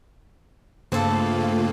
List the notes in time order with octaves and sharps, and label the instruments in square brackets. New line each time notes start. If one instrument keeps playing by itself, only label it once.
[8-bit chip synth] G2 C#3 A#3 [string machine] A3 F4 [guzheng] C4 A4